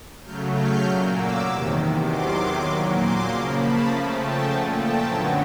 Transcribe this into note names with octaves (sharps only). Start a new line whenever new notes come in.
C#3 F#3 A3 F6 G6
F6 G6
A#2 F#3 A#3
D6 E6
E2 C3 D#3
E2 C3 D#3 F#3 C6 D6
A#2 F#3 A#3 B5 C#6
C6 D6
C#3 F3 A#3 A#5 C6
A5 B5
C#3 F3 A3 G#5 A#5
G5 A5
A#2 F3 A3 F#5 G#5
G5 A5
F#2 D3 F#3 B3 G#5 A#5